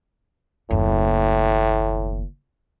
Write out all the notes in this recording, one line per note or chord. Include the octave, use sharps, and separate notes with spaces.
F#1 D#2 A2